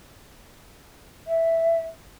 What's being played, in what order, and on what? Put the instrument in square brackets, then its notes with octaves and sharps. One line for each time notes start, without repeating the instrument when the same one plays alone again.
[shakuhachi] E5